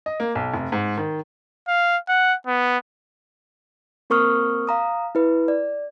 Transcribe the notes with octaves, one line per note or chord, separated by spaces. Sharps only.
D#5
A#3
B1
F1
G#2
D#3
F5
F#5
B3
A#3 C4 A#4 C#6 D#6 F6
F5 A#5 D#6
E4 B4
D5